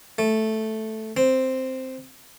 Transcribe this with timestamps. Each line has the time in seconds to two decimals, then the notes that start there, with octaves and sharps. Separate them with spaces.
0.18 A3
1.17 C4